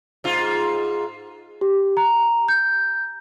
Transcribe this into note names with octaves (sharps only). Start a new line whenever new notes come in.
G#2 F4
G4
A#5
G6